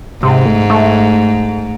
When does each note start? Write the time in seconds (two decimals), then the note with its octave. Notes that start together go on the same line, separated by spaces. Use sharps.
0.22 G#2 C3
0.46 A3
0.70 A3